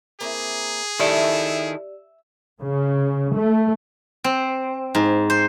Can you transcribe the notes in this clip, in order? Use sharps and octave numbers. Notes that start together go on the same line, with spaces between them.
A#3 C4 E4 G#4
D#3 E4 G4 A4 D5 E5
C#3
A3
C4
G#2
C5